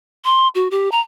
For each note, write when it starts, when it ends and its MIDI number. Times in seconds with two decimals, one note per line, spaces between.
0.25 0.48 84
0.55 0.68 66
0.71 0.91 67
0.92 1.00 82